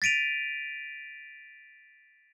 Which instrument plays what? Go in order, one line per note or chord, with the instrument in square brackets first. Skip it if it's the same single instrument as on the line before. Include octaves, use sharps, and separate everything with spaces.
[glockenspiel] A6 B6 D7 D#7 F7